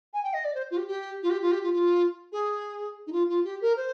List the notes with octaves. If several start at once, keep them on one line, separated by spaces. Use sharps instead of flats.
G#5
G5
D#5
D5
C5
F4
G4
G4
F4
G4
F4
G4
F4
F4
G#4
D#4
F4
F4
G4
A#4
C5